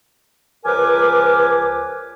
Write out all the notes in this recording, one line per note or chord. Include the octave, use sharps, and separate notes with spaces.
C#2 F3 A#4 B4 G#5 D6